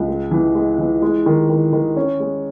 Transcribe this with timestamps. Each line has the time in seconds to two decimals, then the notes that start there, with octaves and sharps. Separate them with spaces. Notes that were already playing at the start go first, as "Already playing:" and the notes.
Already playing: C#2
0.08 G#3
0.31 E3
0.55 G#3
0.79 E3
1.02 G#3
1.26 D#3
1.49 D#3
1.73 D#3
1.96 C#4
2.20 G#3